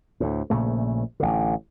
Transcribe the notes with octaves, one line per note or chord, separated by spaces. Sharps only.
D2 A2
A#1 A#2 C#3 A3
A1 D3